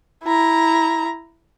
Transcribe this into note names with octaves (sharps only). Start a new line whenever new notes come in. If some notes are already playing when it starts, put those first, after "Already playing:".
E4 A#5